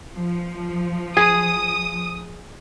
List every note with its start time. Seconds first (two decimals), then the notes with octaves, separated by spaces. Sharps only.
0.13 F3
1.17 G#4 D#6